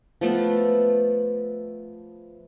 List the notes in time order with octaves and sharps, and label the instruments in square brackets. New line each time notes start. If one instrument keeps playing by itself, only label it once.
[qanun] F3 A3 B3